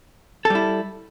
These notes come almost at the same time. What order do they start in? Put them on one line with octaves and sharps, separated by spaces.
A4 G3 E4